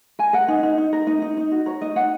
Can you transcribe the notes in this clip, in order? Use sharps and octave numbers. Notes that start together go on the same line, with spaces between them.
A#4 G#5
A#4 F#5
D#4
D#4
D#4
A#4
D#4 D#5
D#4
D#4
F#4
A#4 C#5
D#4 D#5
D#4 F#5